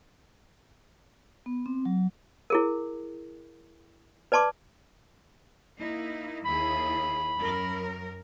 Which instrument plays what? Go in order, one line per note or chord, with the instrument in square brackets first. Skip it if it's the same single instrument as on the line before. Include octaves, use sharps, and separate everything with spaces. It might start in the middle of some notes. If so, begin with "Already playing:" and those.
[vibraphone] B3
C4
F#3
[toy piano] E4 G#4 A#4
B4 D5 A5 C6 D6
[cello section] A#3 D#4 E4
[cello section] D#2 E4 G#4 [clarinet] B5
[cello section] F#2 A#4